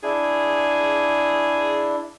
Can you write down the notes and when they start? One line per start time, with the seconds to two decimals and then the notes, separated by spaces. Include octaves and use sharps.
0.03 D4 E4 G#4